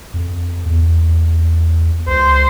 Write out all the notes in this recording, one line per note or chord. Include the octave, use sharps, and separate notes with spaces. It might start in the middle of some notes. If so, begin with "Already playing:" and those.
F2
E2
C#2 C5